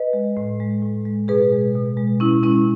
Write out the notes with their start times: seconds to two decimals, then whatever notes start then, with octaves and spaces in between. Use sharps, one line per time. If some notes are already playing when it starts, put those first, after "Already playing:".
Already playing: B4 D#5
0.13 G#3
0.37 A2
0.60 G#3
0.83 A2
1.05 G#3
1.28 B2 G#4 B4
1.52 G#3
1.75 B2
1.97 G#3
2.20 B2 C#4 E4
2.43 G#3 C#4 E4